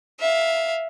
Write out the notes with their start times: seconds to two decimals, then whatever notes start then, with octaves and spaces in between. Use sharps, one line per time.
0.20 E5 F5